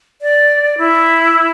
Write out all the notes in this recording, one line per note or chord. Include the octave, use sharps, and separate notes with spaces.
D5
E4